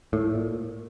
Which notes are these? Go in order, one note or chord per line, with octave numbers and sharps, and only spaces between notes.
A2
A#2